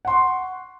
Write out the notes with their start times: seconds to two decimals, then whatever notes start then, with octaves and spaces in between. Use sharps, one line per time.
0.05 F#5
0.07 C6
0.10 C#6